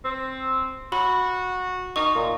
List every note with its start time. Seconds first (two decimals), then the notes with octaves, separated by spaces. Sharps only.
0.04 C4
0.92 F#4 B5
1.96 D#4 C#6
2.15 A#2